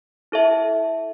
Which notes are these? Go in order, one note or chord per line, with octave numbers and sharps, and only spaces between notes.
E4 A4 E5 A5